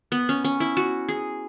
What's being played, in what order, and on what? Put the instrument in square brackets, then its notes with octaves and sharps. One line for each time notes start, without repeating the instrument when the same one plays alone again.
[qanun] B3
C#4
C#4
E4
F#4
G#4